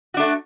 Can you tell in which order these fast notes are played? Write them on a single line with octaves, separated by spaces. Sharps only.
F#4 D4 A3